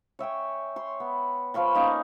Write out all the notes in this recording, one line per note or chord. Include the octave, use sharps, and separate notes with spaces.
C#5 E5 G5 G#5
C#5 C6
B3
F3 F5 B5 C#6
A#3 C#4 D#4 G#5